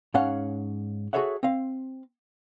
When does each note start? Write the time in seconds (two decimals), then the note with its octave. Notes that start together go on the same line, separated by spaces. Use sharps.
0.14 G#2 C#4 C#5 F5 F#5
1.13 F#4 G#4 A4 C#5 E5 F#5
1.43 C4 F5